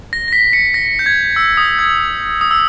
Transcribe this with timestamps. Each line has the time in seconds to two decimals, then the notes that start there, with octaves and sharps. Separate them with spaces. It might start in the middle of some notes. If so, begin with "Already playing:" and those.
0.13 A#6
0.28 A#6
0.33 B6
0.53 C#7
0.74 A#6
0.99 G6
1.06 G#6
1.36 E6
1.57 D#6
1.79 G#6
2.41 D#6
2.51 E6